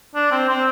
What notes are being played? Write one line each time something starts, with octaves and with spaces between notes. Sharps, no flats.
D4
C4
C4